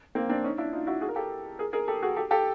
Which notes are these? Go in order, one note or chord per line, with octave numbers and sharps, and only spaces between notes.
A#3 C4
C4 D4
C#4 D#4
D4 E4
D#4 F4
E4 F#4
F#4 G#4
A#4
G4 A4
G#4 A#4
G#4 A#4
G4 A4
F#4 G#4
G4 A4
G4 A4